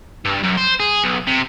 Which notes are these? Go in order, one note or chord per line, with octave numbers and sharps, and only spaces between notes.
G2
F#2
C5
G#4
B1
C3